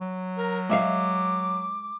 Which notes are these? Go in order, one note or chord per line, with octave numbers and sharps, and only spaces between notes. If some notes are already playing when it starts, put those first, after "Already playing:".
F#3
A#4
G#3 E5 F5 D6